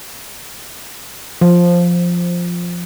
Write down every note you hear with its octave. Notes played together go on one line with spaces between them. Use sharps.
F3